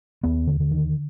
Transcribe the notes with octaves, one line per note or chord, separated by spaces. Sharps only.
D#2 B3
D3
D3
D#3